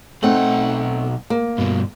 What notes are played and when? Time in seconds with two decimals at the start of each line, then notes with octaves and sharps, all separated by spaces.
0.23 B1 A3 C4 D#4 F#5
1.30 A#3
1.58 G2 B2